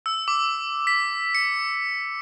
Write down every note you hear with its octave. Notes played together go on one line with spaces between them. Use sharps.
E6
D6
B6
C#7